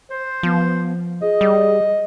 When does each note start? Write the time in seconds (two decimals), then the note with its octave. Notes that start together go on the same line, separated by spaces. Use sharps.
0.10 C5
0.43 F3 B3
1.22 G#4 D#5
1.41 G3